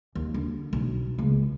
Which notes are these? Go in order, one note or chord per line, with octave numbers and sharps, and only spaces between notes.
D#2
D3
B1
C#2